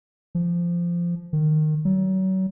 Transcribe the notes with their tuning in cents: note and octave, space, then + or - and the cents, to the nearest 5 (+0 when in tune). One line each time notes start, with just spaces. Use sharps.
F3 -15
D#3 -15
F#3 +35